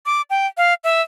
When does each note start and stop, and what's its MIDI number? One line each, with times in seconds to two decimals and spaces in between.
0.06 0.22 86
0.30 0.47 79
0.57 0.74 77
0.84 1.02 76